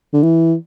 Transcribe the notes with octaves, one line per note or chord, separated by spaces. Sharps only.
D3
E3